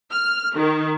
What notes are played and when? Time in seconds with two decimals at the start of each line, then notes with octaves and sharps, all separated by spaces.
0.12 F6
0.55 D#3